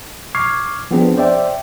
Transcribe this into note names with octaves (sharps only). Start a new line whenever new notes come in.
C#6 D6 F6 G#6 C7
F3 B3 C4 D4 G#4
C5 D5 E5 G5